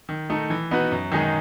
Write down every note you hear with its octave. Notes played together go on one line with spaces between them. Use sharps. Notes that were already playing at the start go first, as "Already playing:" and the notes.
D#3
A3 D#4
E3
B3 D#4 F#4 B4
F#2
D#3 G#3 D#4 G#4